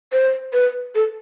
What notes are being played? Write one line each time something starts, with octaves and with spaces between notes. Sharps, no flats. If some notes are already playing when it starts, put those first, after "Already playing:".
C5
B4
A4